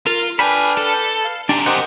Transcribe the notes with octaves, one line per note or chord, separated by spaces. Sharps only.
F4 A#4
D4 A4 B4 G5 G#5 B5 F6
A4
F5
F#2 C3 D4 G4
G4 A#4 C5 D#5 F#5 D#6